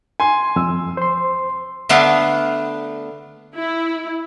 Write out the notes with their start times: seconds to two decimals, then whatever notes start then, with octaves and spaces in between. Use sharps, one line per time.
0.20 G#5 C6
0.56 F2 E6
0.97 C5 C6
1.89 D3 A3 B3 D4 F5 F#5
3.56 E4